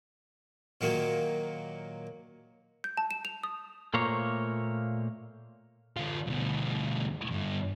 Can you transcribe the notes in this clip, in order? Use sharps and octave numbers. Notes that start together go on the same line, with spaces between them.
A#2 D#3 F#3 A#3
G6
A5
E7
F7
D#6
A#2 A3 A#3 C5 C#5 A#5
D3 F4
D2 B2
G2 D3